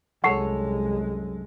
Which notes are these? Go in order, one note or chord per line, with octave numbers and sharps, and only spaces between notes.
C2 F#2 G#3 A4 C#5 F#5 C#6 C7